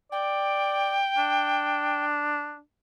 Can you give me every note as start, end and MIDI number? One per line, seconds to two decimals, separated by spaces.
0.12 1.00 74
0.12 2.04 79
1.18 2.59 62